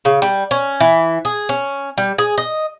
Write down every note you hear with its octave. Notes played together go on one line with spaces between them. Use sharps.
C#3
G3
C#4
E3
G#4
C#4
G3
G#4
D#5